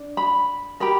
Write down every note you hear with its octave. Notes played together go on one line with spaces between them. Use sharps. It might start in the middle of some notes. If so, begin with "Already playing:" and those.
Already playing: D4
B5
G4 A#4 B5